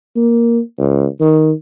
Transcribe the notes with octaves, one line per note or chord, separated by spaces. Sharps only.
A#3
C#2
D#3